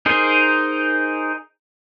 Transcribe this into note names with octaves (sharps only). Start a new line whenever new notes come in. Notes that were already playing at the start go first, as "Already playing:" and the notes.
D#4 G#4 A#4 C5